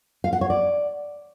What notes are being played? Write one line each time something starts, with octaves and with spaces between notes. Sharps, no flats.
F5
F#5
C#5
D5